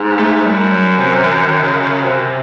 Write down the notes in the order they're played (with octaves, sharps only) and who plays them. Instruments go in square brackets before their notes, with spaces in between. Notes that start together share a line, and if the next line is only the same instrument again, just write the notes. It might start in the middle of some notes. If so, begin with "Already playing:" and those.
Already playing: [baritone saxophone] G#2
[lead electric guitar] A3
[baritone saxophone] F#2 [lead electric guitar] G3
[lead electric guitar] F#3
C3
E3
D#3
C#3
C#3
[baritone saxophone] F#2 [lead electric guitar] C3